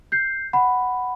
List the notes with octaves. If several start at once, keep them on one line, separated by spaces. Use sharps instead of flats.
G6 C7
F#5 B5